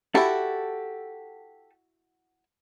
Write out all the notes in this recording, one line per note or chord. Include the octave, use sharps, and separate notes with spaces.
E4 F#4 G4 A4